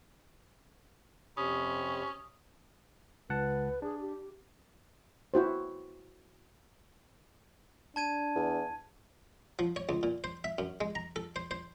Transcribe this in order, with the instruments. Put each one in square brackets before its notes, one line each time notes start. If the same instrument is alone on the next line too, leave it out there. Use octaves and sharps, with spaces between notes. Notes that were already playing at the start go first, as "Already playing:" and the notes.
[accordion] F2 C3 B5 [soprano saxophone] C#4 [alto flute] G4 [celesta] D#6
[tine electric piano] C#2 F#5 A5 [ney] B4
[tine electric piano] D4 [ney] G#4
[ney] G4
[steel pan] E4 F#4 C5
[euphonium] D4 [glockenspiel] A5 G#6 D#7
[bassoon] E2
[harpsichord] F3
C#5
C#2
A#2
C5
E5
F#2
G#3
A#5
A4
C5
C5